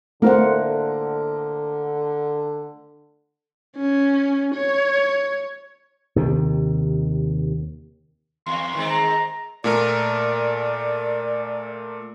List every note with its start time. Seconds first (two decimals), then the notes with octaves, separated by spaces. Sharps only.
0.22 D3 A3 A#3 F4 A#4 C5 F#5
3.76 C#4
4.55 C#5
6.16 D#2 C3 D#3
8.46 E2 C6
8.75 D#3 G#3 C4
8.90 A#5
9.64 A#2 A3 A#4 D5